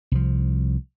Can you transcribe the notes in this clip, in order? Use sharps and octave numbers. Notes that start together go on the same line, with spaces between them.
C2 F3